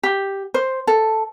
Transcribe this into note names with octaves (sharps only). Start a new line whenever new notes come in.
G4
C5
A4